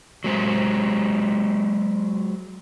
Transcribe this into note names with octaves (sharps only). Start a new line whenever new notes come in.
F#3 G#3 C5